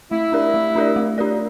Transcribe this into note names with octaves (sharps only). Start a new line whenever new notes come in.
A3 E4
D4 G4 A#4 D5
A3
D4 G4 A#4 D5
A3
D4 G4 A#4 D5